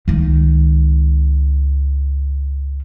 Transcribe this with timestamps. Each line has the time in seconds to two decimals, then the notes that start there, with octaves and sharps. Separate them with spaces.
0.08 C#2 D#3